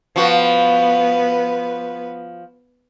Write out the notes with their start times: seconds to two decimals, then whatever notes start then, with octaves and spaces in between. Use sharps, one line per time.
0.16 F3 B3 F#4 B4